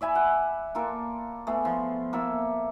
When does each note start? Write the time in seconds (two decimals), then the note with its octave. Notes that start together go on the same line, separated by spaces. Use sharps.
0.01 D5 E5 G#5 B5
0.15 F#5
0.75 A#3 F4 A4 A#4
1.47 A3 B3 G#4
1.65 F3
2.13 A#3 A4 E5